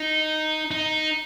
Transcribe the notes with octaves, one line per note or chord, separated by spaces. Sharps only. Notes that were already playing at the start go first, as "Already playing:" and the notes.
Already playing: D#4
D#4